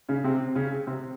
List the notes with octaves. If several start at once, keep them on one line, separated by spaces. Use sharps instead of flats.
C#3 C#4
C3 C4
C#3 C#4
C3 C4